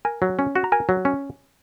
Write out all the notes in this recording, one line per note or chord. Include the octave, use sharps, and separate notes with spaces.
A#4 G#5
F#3
C#4
F#4
A#5
A#4 G#5
F#3
C#4